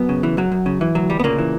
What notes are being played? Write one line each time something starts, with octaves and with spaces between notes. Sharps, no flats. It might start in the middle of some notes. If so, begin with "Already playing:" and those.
Already playing: F#2 B3
C#3
E3
F#2 F#3
F#2
C#3
E3
D2 F#3
D2 G3
B3
A#2 C#3 A#3
E3